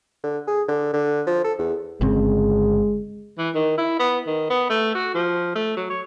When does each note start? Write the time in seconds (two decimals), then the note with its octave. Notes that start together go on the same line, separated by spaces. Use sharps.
0.24 D3
0.47 G#4
0.68 D3
0.93 D3
1.27 F3
1.44 A4
1.58 E2
2.01 G1 C#3 G#3 C4
3.38 E3
3.55 D#3
3.77 E4
3.99 B3
4.27 D#3
4.50 B3
4.70 A3
4.95 F#4
5.14 F3
5.55 A3
5.77 F#3
5.90 C#5